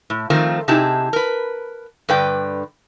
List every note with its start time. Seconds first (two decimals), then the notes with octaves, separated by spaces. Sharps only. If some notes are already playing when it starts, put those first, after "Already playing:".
0.10 A2
0.30 D#3 F3 A3 C4 F4 A#4
0.68 C3 D#4 E4 G4 G#4 A5
1.13 A#4 B4
2.09 G2 D3 B4 D5 G5